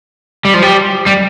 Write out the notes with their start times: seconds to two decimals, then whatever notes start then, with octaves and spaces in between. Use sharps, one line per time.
0.45 G3
0.54 F3
0.62 G3
1.06 G3